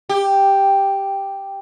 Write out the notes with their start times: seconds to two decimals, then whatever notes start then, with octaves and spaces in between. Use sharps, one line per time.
0.09 G4